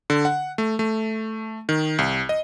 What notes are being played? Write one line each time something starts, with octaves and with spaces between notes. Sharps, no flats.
D3
F#5
A3
A3
D#3
C2
D#5